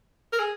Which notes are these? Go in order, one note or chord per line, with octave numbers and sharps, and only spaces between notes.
A#4
G#4